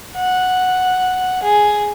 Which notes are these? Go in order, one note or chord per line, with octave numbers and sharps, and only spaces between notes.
F#5
G#4